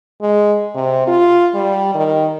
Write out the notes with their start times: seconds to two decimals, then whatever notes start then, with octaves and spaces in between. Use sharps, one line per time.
0.22 G#3
0.75 C3
1.07 F4
1.54 G3
1.95 D#3